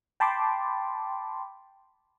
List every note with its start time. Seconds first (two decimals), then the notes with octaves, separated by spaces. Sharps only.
0.20 G5 A5 B5 C6 D6